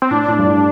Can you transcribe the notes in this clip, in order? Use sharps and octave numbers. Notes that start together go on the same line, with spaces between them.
C4
A2 D4
A2
G2
A2